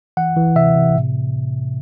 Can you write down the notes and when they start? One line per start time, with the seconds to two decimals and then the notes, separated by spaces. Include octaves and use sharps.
0.17 E3 F#5
0.37 E3
0.56 C3 E5
0.76 C3
0.95 A2